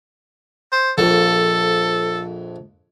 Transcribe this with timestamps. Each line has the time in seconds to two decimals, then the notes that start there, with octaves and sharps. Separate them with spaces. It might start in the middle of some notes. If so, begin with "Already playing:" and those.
0.72 C5
0.98 A#1 F2 A4